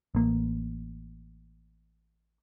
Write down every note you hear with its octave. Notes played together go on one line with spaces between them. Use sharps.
A1 A#3